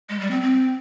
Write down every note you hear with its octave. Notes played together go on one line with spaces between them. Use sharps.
G#3
G3
C4
C4